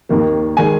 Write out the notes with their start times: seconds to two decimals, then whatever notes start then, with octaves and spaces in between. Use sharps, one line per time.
0.09 D#2 D#3 A#3
0.57 D#3 G#3 G#5